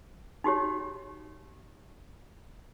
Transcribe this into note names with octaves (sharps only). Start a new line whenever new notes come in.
D#4 F#4 G4 C#5